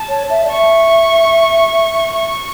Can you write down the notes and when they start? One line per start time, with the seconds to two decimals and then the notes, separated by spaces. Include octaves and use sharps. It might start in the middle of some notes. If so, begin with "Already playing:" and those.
Already playing: A5
0.09 C#5
0.30 E5
0.45 D5
0.50 E5 C#6
2.16 C#6